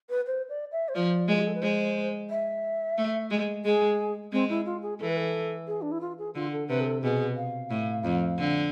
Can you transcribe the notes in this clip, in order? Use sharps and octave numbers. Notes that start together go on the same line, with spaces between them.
B4
C5
D5
E5
C5
F3 D5
G#3
F4
G#4
A4
B4
G#3 C5
E5
A3
G#3
G#3 G#4
G#3 C4
E4
F4
G#4
E3 A4
B4
A4
G#4
D4
E4
F4
G#4
D3 F4
A4
C3 B4
G#4
A4
B2 G#4
F5
A2
F2
D3